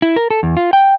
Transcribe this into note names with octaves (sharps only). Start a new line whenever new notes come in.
E4
A#4
A4
E2
F4
G5